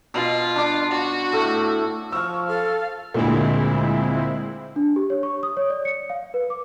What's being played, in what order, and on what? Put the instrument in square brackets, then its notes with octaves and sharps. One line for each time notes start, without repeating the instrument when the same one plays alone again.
[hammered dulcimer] B2 B5 [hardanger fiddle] F4
[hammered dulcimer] D4 D6
[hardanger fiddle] F#4
[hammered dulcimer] A2 A3
[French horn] F3 [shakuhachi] C#6 [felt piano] E6 F6
[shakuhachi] A4 [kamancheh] F5
[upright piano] D2 A#2 [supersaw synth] G#3 C4 E4
[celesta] D4
G4
C#5
C#6
D#6
C#5
D5
C#7
F5
B4
D6